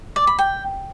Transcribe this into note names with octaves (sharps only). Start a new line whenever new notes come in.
D5
B5
G5